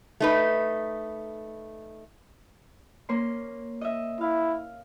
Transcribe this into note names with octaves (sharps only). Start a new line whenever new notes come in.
A3 D#4 B4
A#3 C#4 C6
D#5 E5
E4 F5